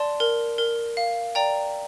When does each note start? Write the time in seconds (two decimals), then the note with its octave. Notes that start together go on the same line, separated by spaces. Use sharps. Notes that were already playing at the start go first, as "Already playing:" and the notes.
Already playing: D5 A5 C6
0.20 A#4
0.58 A#4
0.97 F5
1.35 D5 G5 A#5